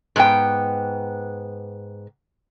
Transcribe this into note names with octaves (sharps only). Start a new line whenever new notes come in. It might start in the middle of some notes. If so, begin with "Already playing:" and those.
G#2 B3 G5